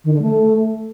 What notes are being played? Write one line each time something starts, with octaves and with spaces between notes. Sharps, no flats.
D#3
D3
A3